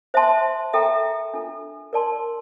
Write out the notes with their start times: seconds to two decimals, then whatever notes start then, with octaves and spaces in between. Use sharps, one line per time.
0.14 C5 E5 A5 C6
0.73 A4 E5 G5 A#5
1.34 D4 F4 A4
1.93 A#4 D5 A5 C6